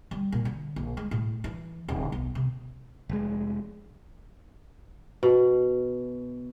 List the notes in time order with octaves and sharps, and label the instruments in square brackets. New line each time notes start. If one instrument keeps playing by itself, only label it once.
[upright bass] G3
A#2
D3
A#1
G#3
A2
E3
D1
B1
C3
[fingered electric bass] F1 G#3
[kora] B2